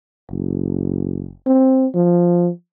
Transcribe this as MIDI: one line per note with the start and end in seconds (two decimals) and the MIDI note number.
0.30 1.32 30
1.47 1.86 60
1.95 2.50 53